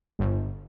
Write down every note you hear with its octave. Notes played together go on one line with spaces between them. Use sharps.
G1